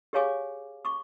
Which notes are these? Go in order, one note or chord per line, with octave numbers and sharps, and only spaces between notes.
G4 G#4 C#5 F5 G#5 D6
C#6 D6